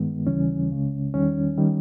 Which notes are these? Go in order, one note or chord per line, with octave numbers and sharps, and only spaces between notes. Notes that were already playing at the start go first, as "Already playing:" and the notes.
Already playing: G2 D#3 G#3 B3
D#2 C#3 E3 G3 C#4
C#2 C#3 G#3
E2 D#3 G3 C#4
D#3 G3